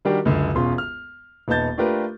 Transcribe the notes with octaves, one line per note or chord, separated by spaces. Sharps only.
D#3 G3 D4 F#4 G4 A#4
C#2 F#2 D3
E1 B2 C#4 F4 C6
F6
D#1 B3 D#4 A5 G6 A6
A3 D4 F4 G4 A#4 B4